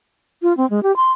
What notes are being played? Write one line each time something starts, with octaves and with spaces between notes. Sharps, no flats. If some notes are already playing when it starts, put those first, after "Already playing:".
F4
C4
G#3
G4
C6